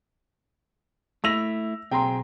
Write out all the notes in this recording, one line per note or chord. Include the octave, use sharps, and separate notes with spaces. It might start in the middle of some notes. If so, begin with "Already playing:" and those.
A3 E4 E6 A#6 F7
B1 C4 G#4 G5 A#5 C6